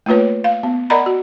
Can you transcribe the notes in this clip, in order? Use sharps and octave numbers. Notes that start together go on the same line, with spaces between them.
A3 A#3 F4 B4 C#5
F5
B3
A#4 D5 D#5 F#5 A#5 B5
F#4